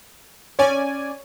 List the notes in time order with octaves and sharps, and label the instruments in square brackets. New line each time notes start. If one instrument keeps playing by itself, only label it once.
[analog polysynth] C#4 D5 G#5 [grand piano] C#5